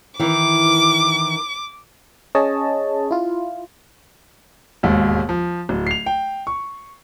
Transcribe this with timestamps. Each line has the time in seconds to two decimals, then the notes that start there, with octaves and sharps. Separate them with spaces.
0.19 D#3 E3 E4 D6
2.35 C#4 G#4 C#5 D#5 A5
3.11 E4 F4
4.83 E1 D#2 G#2
5.29 F3
5.69 D1
5.87 C7 F7
6.06 G5
6.47 C#6